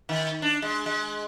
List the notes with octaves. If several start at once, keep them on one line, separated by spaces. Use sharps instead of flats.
D#3
D4
G#3
G#3